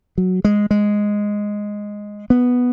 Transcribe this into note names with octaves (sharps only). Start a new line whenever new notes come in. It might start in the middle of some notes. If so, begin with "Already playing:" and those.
F#3
G#3
G#3
B3